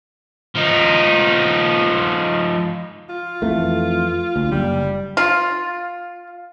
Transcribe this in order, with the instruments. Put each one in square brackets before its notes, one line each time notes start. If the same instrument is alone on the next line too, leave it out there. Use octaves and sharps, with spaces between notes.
[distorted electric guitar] F3 D#4
[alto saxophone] F4
[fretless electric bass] F2 E3 A3
D2
[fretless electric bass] F#1 [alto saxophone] G3
[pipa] F4